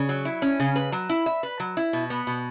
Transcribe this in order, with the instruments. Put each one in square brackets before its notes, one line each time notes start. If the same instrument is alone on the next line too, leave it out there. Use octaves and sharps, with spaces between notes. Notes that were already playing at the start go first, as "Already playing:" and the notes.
Already playing: [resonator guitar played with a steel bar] C#3
F#3
E4
C#4
C#3
B4
F#3
E4
E5
B4
F#3
E4
B2
B3
B2